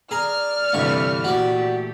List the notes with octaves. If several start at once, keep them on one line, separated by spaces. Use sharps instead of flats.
G#4 D5 A#5 F6
D2 G2 C3 E3 A3 C#6
A#2 A3 F#4 G4 D5